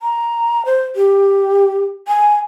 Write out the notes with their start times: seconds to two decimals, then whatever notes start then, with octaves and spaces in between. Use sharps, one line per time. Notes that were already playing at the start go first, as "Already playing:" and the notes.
0.02 A#5
0.66 C5
0.96 G4
2.08 G#5